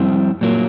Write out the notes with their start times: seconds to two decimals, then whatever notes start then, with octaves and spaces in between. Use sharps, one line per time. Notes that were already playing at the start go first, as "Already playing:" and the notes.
Already playing: F2 G3 C4 E4
0.41 A#2 F#3 A#3